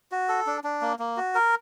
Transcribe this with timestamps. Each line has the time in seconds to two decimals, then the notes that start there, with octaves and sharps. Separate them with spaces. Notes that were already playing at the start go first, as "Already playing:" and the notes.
0.11 F#4
0.29 A4
0.47 D4
0.64 D4
0.81 A#3
0.99 A#3
1.17 F#4
1.35 A#4